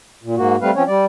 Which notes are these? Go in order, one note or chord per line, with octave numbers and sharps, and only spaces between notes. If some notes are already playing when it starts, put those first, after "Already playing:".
A#2
G#2 A#3 F#4
G3 A3 C4 B4 F5
F3 C4 C#4 C#5
G3 D5